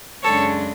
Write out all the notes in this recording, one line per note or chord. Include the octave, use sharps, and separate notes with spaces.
F#2 C#3 G#3 D4 A4 C#5